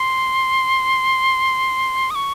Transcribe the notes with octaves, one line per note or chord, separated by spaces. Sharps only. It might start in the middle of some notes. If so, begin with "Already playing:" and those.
Already playing: C6
D#6
C#6